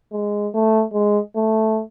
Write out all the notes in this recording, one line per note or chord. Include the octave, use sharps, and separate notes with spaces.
G#3
A3
G#3
A3